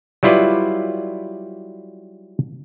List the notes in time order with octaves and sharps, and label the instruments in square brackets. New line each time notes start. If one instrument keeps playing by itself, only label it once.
[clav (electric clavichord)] F#3 G3 E4 F4 B4 D5